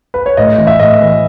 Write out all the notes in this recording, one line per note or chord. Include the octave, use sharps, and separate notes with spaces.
B4
C#5
A2 D#5
E3
E5
A2 D#5
E3